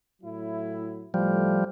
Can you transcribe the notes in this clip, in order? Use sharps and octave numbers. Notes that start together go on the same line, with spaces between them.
A2 F#3 E4
A2 F3 G3 A3